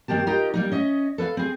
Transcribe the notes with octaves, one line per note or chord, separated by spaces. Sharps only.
G2 D#3 A#3 G4 A5
D#4 F4 G4 A#4 D#5 A#5
G3 A#3 D#4
C#4 D#5 E5
A4 B4 C#5 F5
C4 G#4